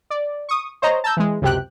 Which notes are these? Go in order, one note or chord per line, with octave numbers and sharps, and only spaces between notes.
D5
C#6 D#6
C5 C#5 D#5 A#5
A5 A#5 E6 G6
E3 G#3
C#2 F#2 C3 G4 G5 F#6